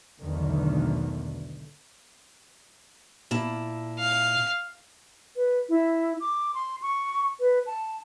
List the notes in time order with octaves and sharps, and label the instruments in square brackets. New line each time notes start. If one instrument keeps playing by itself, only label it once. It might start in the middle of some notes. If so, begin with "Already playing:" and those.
[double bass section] B1 E2 G#2 D3 D#3 A3
[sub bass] A#2 [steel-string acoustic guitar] A#3 E4 A5
[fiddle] F5
[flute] B4
E4
D6
C6
C#6
B4
A5